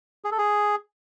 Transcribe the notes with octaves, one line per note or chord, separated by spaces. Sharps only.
G#4
A4
G#4